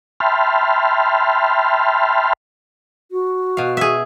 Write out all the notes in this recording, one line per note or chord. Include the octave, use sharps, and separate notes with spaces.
E5 G5 A5 B5 C6 F6
F#4
B2 F5
G#4 E5